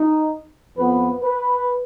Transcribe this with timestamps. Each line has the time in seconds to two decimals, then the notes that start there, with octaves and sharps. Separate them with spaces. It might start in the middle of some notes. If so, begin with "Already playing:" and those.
Already playing: D#4
0.76 F2 F3 B3 B4
1.23 B4